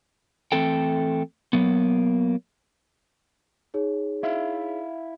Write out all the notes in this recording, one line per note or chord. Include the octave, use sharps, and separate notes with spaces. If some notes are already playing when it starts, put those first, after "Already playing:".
E3 A3 C4 A4 G5
F#3 A#3 B3
D#4 G#4 C#5
E4 E5 F5